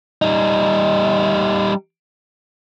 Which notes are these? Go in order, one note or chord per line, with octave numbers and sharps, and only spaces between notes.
G3 D#4